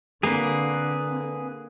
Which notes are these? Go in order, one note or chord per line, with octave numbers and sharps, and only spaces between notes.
D3 A#3 C4 G#4 B4